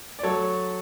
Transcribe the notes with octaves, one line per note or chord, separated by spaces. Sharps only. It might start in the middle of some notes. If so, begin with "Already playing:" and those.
D5
F#3 A4 C#5